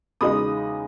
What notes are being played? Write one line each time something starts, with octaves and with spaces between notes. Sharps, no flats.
E2 C#3 G#3 D#4 B5 D#6